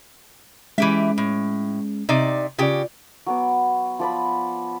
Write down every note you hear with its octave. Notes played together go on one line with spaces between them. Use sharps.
E3 G#3 C#4 G4 E5
A2
C3 D#4 D5
C#3 F4 G4 D5
F#3 B3 D6
F3 D5 B5